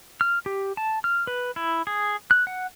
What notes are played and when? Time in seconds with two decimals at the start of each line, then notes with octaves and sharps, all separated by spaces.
0.21 F6
0.46 G4
0.77 A5
1.04 F6
1.27 B4
1.56 E4
1.87 G#4
2.31 F#6
2.47 F#5